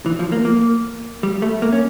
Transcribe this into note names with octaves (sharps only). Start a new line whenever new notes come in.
E3
F3
A#3
A#3
G3
A3
A#3
C#4